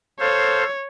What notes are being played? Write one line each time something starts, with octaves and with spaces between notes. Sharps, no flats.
A4 C5 C#5 F5